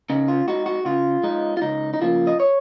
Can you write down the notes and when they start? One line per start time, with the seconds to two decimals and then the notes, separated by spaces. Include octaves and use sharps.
0.10 C#3 D#4
0.28 F4
0.48 G#3 D#4 F#4
0.66 F#4
0.85 C#3 F4
1.23 G#3 D#4
1.57 F4
1.62 C#2 D#4
1.94 D#4
2.01 C#3 F3 A#3 F4
2.27 D#5
2.40 C#5